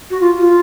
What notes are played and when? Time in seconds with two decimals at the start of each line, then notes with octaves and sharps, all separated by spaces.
0.11 F#4
0.21 F4
0.40 F4